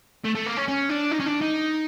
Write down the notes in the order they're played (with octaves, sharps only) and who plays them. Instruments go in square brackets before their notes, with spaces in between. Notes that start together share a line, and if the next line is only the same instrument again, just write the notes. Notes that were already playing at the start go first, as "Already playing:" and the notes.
[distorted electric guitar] A3
A3
A#3
C#4
C#4
D4
D#4
C#4
D4
D#4